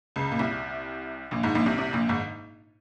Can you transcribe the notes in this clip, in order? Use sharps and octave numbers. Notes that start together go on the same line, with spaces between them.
C#2 C#3
A#2
C2 C3
A#1 A#2
G#1 G#2
A#1 A#2
C2 C3
C2 C3
A#1 A#2
G#1 G#2